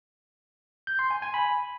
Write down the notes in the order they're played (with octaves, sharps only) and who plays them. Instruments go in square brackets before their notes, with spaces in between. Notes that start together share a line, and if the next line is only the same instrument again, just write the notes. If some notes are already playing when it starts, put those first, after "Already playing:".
[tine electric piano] G6
C6
G#5
G#5
B5